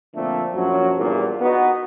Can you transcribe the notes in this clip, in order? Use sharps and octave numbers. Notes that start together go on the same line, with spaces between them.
A#2 D3 F3 A3 A#3 C4
A#1 F#2 F3 F#3
E2 G2 A#2
B3 D#4 F#4